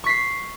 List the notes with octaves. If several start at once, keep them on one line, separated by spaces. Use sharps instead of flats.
C#6 B6 C7